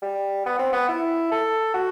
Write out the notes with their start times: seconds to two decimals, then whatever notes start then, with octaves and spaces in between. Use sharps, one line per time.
0.02 G3
0.46 B3
0.59 C4
0.73 B3
0.89 E4
1.31 A4
1.74 F#4